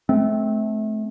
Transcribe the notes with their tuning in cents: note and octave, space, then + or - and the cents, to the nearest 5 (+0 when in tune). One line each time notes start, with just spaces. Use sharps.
A3 -30 C4 +0